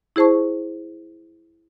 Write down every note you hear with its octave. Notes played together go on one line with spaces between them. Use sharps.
E4 G#4 C5 A5 C#6